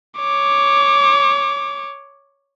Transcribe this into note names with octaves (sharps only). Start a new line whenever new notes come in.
C#5 D6